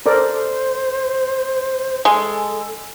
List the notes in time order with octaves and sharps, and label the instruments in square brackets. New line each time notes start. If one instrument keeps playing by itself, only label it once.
[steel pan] A4 A#4 D5 [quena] C5
[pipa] G#3 [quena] A4